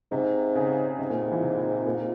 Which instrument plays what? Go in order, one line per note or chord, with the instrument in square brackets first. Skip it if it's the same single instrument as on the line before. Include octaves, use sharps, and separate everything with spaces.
[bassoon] G#2 [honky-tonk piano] C3
[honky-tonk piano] C#3
[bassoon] G#2 [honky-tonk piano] C3
[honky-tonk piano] A#2
E3
C3
A#2